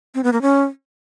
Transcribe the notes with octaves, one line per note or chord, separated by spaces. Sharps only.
C4
B3
A#3
C#4